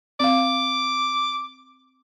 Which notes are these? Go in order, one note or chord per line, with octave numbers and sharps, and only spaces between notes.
C4 F5 D6